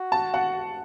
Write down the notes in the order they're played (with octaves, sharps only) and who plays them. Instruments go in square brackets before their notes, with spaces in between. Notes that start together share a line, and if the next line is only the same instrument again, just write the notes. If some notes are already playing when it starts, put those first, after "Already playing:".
Already playing: [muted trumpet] F#4
[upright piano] A5
F#5